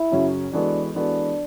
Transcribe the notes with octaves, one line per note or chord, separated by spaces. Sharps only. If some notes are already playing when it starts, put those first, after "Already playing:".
Already playing: E4
F#2 C#3 F#3 C#4 F#4
E3 G#3 B3 D4 F#4 A4
E3 G#3 B3 D4 F#4 A4